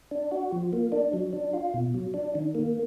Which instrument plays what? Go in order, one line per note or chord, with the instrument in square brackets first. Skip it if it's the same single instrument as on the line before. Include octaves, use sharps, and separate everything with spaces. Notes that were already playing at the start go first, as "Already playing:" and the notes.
[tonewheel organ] D4
F#4
F3
A#3
D4
F#3
D4
F4
B2
F#3
D4
D#3
A#3